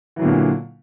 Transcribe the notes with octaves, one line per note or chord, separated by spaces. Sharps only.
A#2 D3 E3 F#3